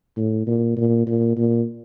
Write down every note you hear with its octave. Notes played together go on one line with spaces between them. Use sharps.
A2
A#2
A#2
A#2
A#2